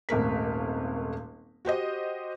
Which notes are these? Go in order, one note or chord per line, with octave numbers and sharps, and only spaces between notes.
D#1 G#1 A3 A#4 B6
F#4 G4 C5 D#5